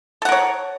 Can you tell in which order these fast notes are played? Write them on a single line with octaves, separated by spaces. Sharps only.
A4 F#5 A#4 C#5